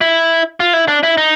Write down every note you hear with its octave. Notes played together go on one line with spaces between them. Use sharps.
E4
F4
E4
D4
E4
D#4